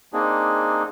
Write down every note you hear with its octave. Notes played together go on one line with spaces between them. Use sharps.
A#3 C4 D4 D#4 G#4